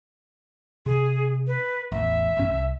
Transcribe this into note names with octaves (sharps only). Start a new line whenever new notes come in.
C3 G#4
B4
A1 E2 E5
A1 G2 C#4
C2